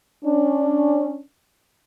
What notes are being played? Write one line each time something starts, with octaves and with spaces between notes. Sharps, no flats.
C#4 D4